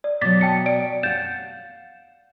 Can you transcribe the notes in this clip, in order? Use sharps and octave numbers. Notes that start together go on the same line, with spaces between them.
D5
B2 F#3 D6 A6 B6
G5 A5 C#7
D5 D7
F5 F#5 G6 A6 E7